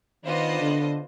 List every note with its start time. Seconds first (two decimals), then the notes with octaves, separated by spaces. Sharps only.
0.24 D#3 B3 D4 F4 C5 D#5
0.60 D3